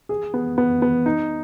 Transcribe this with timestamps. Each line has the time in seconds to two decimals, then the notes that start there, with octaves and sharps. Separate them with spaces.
0.09 G#4
0.34 B3
0.58 B3
0.82 B3
1.06 D#4